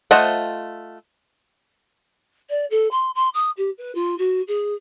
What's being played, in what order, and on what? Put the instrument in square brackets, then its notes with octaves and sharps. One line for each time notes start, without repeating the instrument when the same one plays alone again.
[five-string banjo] A3 F4 C5 D#5 F#5
[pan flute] D5
A4
C6
C6
D#6
G4
B4
F4
F#4
G#4